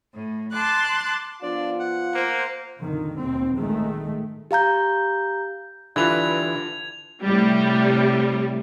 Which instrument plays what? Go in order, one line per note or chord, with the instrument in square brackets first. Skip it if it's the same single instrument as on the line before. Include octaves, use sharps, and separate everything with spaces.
[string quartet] A2
A5 C6 D6 F#6
[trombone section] F3 B3 F4 [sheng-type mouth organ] D4 D5
[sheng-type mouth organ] F#5
[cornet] A#3 [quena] C5
[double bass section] F2 A#2 D3 D#3
D#2 B2 C4
A#1 A2 D#3 G#3 A3
[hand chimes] G4 F5 A#5 G6
[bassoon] G2 [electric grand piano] D3 F4 [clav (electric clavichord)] E3 B4 [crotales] G#6 F7
[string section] A2 C3 G3